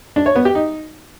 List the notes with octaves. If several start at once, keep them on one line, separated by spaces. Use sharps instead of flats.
D4
C#5
B3
G4
D#4